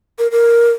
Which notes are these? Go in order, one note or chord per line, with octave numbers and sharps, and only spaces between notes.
A#4
A#4